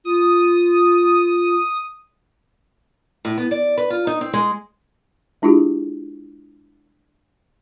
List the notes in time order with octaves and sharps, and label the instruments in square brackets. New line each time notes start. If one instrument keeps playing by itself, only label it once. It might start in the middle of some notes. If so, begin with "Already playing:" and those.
[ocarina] F4 [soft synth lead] D#6
[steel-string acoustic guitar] A2
B3
D5
B4
F4
D#4
C4
G#3
[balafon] G#3 D4 E4 F4 G4 G#4